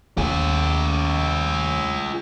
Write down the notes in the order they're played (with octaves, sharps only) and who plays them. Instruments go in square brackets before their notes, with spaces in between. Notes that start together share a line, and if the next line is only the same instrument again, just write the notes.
[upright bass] D#2 [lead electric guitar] F4 G#4